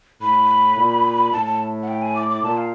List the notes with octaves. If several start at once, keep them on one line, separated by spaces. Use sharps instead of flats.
A2 B5
A#2
A2 A5
A5
F#5
G5
G#5
D6
D6
A#2 A5
F5